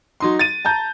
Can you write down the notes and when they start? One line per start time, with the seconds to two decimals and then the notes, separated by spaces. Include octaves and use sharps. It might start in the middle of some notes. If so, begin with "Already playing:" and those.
0.20 F#3 D#4 C6
0.39 A6 D#7
0.65 A5 A#5 G6